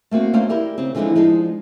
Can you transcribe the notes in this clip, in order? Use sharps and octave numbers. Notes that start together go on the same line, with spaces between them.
A3 A#3 C4 F#4
A3 A#3 C#4 C5 D5 F5
E4 G4 A#4 D5
C#3 C4
D3 E3 F3 G#3 D4 D#4
F3 G#3 D4 D#4